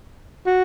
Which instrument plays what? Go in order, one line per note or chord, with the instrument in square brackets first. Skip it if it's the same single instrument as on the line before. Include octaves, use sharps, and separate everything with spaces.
[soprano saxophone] F#4